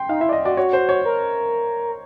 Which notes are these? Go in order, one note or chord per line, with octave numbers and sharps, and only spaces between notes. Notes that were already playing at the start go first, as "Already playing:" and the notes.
Already playing: G5 C6
D#4 F5
E4 E5
D5
D#5
F#4 D5
F#4 C#5
C5
C#5
A#4